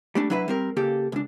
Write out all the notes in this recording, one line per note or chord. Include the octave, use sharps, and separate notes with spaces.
G3 A3 D4
F#3 D4 E4 B4 E5
G3 C4 A#4
C#3 A#3 G4 A4
C#2 D4